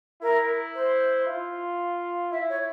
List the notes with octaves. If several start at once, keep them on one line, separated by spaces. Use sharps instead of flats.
E4 A#4
C5
F4
E4 E5
C#5